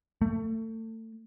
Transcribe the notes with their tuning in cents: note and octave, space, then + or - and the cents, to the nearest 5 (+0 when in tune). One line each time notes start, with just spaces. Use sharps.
A3 +30